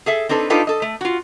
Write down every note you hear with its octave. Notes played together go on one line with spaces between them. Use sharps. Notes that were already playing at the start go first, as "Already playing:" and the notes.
G#4 A4 E5
C4 D4 D#4 A4 B4
D4 D#4 F4 G4 A4 B4
A4 D#5
A3
F4 F#4